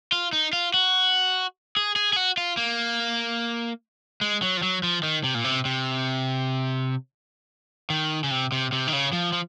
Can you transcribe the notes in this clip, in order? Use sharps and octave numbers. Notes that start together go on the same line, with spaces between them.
F4
D#4
F4
F#4
G#4
G#4
G#4
F#4
F4
A#3
G#3
F#3
F3
F#3
F3
D#3
C3
A#2
C3
C3
D#3
C#3
C3
C3
C3
D#3
C#3
F3
F3